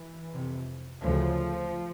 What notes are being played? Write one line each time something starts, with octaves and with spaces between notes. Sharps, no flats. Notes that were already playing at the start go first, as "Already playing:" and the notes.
Already playing: E3
F2 C3
D2 C#3 F3